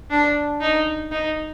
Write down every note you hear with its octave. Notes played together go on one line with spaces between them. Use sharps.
D4
D#4
D#4